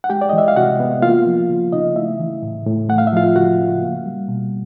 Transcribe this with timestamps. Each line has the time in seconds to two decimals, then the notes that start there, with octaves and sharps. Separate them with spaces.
0.04 F#5
0.09 G#3 G4 G5
0.21 D5
0.29 E3 D#5
0.38 E5
0.48 F5
0.56 C3 F#4 F#5
0.80 B3
1.02 A#3 F4 F5
1.27 F3
1.49 C#3
1.72 C#3 D#4 D#5
1.96 A3 E4 E5
2.19 E3
2.43 A2
2.66 A2
2.89 A3 F#5
2.98 F5
3.07 E5
3.13 F3 F4 F5
3.36 C#3 F#4 F#5
3.59 C#3
3.82 A#3
4.06 G3
4.28 B2